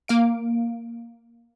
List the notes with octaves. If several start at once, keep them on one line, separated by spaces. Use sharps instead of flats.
A#3 F5 D7